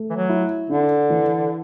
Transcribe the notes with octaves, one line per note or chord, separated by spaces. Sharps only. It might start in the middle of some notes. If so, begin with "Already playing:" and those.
Already playing: A3
E3
F#3
E4
D3 D4
E3